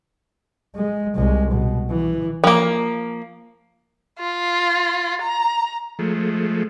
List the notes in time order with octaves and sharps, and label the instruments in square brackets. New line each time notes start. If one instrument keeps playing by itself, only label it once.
[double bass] G#3
C2 G#3
B2
E3
[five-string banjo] F3 A#3
[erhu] F4
A#5
[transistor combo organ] F3 G#3 A3